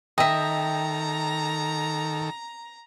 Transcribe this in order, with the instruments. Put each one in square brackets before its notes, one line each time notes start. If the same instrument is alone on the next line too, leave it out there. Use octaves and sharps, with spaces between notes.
[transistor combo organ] D#3 A4 [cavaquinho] D#5 E5 [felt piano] G5 [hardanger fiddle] A#5